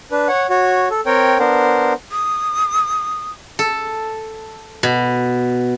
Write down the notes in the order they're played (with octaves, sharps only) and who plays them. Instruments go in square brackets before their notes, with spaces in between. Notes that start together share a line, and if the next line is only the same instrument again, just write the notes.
[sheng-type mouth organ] D4 B4
C#5 F#5
F#4 C#5
A4
C4 A#4 C#5 G5
B3 D4 A#4 C5
[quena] D#6
[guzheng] A4
B2